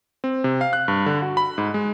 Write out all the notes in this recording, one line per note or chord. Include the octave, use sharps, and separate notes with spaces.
C4
C3
F5
F#6
G2
D3
F#4
B5
G#2
G#3